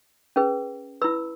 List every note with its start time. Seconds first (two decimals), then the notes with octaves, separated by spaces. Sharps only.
0.36 C#4 G#4 B4
1.02 E4 B4 B5 E6